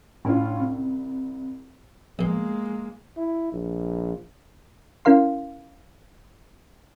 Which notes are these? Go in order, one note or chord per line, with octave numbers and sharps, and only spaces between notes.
A2 C#4 D4 F4
C2
A#1 B2 G#3 A#3
E4
A#1
C#4 E4 A#4 F5 C6